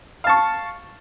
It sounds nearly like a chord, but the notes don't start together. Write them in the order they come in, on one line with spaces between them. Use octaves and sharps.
F5 A5 C#6